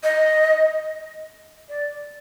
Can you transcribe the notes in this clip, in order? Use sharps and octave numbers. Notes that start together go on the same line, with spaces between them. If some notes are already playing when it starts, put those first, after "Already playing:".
D#5
D5